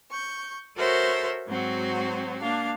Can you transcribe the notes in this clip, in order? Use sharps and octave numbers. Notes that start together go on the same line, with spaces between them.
C#6 G6
F#4 A4 A#4 C5 C#5 E5
G#2 F#3 C4 F#4
A#3 D4 F5